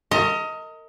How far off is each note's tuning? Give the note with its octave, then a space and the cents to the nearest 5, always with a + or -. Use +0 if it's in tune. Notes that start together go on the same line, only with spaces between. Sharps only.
A#4 -30 D#5 +20